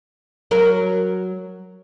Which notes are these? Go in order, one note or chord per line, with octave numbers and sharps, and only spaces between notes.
F#3 A#4